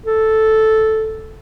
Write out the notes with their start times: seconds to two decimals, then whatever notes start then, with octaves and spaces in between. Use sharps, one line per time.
0.06 A4